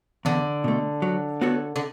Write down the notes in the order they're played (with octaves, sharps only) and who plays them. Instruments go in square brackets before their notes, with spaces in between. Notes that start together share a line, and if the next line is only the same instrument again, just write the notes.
[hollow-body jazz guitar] E2 [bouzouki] D3
[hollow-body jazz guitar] B2 A3
F#3
B3 F#4 A4 C#5
[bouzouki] D3